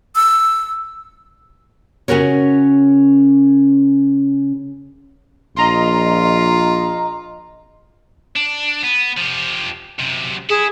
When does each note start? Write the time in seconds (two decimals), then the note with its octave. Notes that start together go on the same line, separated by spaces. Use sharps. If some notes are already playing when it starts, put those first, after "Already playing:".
0.15 E6
2.08 C#3 C#4 F#4 A#4 C#5
5.56 A#1 F4 D#5 A#5 C6
8.36 D4
8.83 B3
9.17 F3 G4
9.99 F#2 C3
10.50 E4 G#4